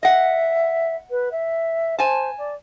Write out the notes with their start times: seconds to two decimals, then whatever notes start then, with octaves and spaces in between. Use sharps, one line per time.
0.03 D#5 E5 F#5
1.10 B4
1.31 E5
1.99 C5 G#5 A5
2.38 D5